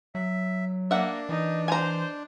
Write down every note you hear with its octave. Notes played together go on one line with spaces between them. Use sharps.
F#3 E5
A#3 D4 E5 F#5
E3 D#4
C5 G#5 A#5